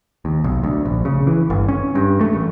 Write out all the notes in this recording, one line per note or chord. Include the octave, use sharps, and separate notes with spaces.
D#2
B1
D2
A#1
C#3
E3
G1
C#4
G2
A3
A1